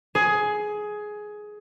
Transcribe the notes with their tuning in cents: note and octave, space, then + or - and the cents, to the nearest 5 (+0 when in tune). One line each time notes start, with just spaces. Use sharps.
G#4 +15